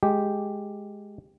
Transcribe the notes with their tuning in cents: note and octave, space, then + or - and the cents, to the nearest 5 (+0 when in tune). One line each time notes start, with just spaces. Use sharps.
G#3 +5 G4 +0